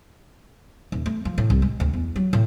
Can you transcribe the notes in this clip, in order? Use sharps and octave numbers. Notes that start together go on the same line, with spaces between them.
D#1
A3
F3
A2
C2
G#3
D2
E2
F#3
A2